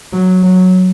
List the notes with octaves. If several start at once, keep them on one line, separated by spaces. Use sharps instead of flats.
F#3
F#3